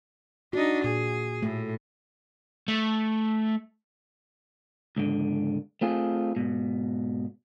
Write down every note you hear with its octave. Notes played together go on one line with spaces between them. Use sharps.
D4 D#4 F#4
A#2 G#4
A2 A3
A3
C#2 G#2 D3
A3 C4 F4 G#4
G#2 B2